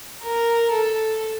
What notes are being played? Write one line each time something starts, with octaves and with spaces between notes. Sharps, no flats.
A#4
A4